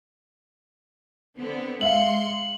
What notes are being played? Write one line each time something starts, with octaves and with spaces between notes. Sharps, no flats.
D3 B3 C4
G#3 E5 F5 C6 C#7 F#7